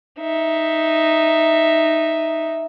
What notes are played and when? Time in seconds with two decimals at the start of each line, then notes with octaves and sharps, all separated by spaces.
0.20 D#4 E5